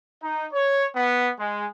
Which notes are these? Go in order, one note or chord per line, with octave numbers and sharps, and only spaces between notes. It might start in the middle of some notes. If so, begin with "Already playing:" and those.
D#4
C#5
B3
G#3